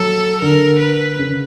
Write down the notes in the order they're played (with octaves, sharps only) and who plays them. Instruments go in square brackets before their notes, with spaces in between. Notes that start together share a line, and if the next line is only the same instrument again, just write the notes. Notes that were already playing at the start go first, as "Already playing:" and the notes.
Already playing: [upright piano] F#3 [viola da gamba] A4
[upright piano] D3 [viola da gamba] A#4
[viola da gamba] B4
[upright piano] C#3